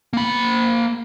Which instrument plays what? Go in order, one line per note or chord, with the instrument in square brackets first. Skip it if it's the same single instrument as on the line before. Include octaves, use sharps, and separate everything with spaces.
[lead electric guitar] A#3 B5